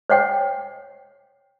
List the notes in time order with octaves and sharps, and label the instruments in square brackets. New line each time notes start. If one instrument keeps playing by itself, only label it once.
[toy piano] C5 C#5 F#5 G5